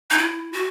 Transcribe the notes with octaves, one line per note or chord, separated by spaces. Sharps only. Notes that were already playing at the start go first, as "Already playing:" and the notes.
D#4
E4
F#4